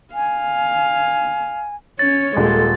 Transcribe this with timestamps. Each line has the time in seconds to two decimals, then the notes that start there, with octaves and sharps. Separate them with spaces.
0.14 F5 G#5
1.99 C#4 C#5 A6
2.37 D#1 G#3 A4